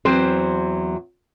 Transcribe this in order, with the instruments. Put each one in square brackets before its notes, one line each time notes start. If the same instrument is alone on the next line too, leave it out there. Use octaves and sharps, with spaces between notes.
[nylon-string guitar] E2 F#3 C4 C5